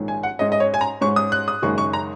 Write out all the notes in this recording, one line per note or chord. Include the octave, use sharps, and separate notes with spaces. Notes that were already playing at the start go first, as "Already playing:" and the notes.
Already playing: A#1 G#2 D#3 G#3 C#4
G#5
F#5
G#2 G#3 C#4 D#5
D#5
C#5
G#5
A#5
G#2 G#3 C#4 C#6
D#6
F#6
D#6
F#1 F#2 D#3 G#3 C#4 C#6
C#6
A#5